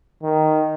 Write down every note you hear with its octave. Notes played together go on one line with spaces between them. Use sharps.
D#3